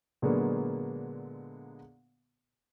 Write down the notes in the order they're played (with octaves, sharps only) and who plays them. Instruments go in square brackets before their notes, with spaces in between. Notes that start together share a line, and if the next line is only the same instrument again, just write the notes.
[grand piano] A#2 D3 F#3 G#3 A#3 B3